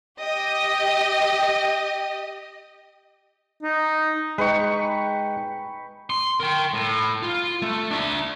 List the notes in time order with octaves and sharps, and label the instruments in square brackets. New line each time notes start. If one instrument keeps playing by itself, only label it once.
[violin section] G4 D#5
[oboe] D#4
[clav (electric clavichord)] G#3 D#4 [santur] B4 G5 C#6
[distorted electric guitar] C6
A#4 G5
A2
F4
A3
D4 E5